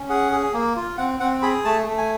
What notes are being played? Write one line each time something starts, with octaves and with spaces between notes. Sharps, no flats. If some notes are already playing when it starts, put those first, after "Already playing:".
Already playing: C#4
G#4 F#5
G#4
A#3
F4
C4 F#5
C4 F#5
G#4 B5
A3 A5
A3
G#5